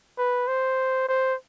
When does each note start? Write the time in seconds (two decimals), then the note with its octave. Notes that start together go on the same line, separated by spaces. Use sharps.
0.18 B4
0.48 C5
1.08 C5